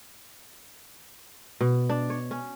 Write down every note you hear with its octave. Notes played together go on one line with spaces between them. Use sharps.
B2
D4
C#5
C#4